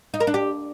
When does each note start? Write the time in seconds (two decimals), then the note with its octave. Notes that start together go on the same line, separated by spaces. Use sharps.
0.14 D#4
0.20 A#4
0.27 D4
0.34 G4